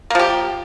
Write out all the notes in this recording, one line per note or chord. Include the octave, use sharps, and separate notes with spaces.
F3 A#3 G4